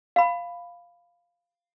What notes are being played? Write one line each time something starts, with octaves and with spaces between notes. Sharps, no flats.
F5 B5